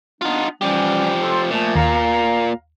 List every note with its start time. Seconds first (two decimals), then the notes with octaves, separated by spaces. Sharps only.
0.22 B3 D4 D#4 F4
0.61 E3 F3 G3 C#4 G4
1.22 F4 A4
1.50 A#2 F3 A3
1.76 D#2 F5 A#5